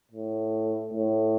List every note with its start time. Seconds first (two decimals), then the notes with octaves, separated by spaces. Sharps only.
0.11 A2
0.93 A2